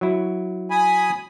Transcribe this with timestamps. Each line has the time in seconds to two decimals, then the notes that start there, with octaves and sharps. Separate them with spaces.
0.01 F#3 E4
0.71 G#5 B5 D#6